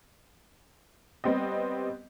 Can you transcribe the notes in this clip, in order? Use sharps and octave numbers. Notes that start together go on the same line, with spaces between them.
G3 B3 C4 G4 D#5